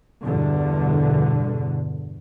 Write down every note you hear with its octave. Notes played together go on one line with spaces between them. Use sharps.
E2 G2 B2 D3